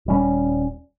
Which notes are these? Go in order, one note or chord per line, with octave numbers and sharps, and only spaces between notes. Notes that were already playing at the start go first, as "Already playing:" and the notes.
D#1 G3 C#4